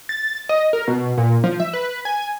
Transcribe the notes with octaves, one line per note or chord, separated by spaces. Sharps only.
A6
D#5
A#4
B2
A#2
F3
E5
B4
G#5